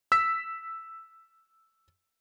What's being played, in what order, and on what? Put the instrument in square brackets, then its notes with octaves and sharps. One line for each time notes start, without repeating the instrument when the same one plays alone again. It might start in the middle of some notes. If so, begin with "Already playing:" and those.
[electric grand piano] E6 B6